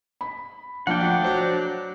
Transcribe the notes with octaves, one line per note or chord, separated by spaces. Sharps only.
B5
F3 A#3 D4 F#5 G5
D2
F#3 C5 A#5